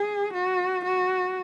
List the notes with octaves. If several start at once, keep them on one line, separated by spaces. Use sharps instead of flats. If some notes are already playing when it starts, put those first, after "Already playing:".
Already playing: G#4
F#4
F#4